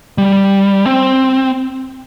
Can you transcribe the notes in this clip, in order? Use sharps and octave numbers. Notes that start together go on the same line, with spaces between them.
G3
C4